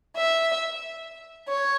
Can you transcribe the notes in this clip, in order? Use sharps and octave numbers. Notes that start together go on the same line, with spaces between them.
E5
C#5